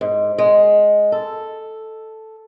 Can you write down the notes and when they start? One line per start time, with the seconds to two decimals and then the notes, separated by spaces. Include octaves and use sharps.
0.01 G#2
0.38 G#3
1.12 A4